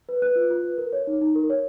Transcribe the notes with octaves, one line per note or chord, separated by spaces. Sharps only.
B4
B4 F#6
F4
F4
B4
A#4
C#5
D#4
D#4
A#4
C#5